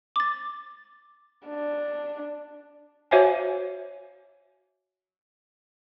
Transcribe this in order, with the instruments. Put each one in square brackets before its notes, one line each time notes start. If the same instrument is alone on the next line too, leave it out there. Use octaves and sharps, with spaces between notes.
[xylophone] D6 A6
[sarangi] D4
[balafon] F#4 C5 C#5 E5 F5 G#5